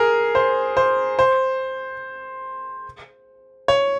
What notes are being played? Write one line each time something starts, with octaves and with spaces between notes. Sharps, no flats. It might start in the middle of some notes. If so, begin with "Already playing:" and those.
Already playing: G#4 A#4
C5
C5
C5
C#5